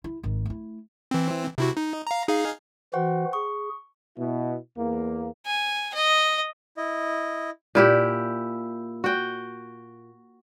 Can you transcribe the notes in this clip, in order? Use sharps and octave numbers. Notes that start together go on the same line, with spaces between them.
E4
G#1 D#3
A3 E4
E3 C4
C3 E4 F#4
D#4
F5 A#5
D#4 G#4 F5
E3 F#4 C5 F#5 G5
G#4 C#6
B2 E4
E2 A#3
G#5
D#5
E4 D#5
A#2 E4 G4
F#4 G5